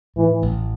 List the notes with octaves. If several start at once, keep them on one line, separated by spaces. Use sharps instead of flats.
A2 E3
A1